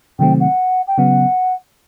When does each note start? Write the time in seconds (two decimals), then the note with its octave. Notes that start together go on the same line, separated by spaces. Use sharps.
0.19 C3 D#3 F#3 A3 C4 G5
0.40 F#5
0.87 G5
0.98 C#3 F#3 B3 F#5